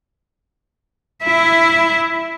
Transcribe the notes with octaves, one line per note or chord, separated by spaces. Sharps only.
E4 E5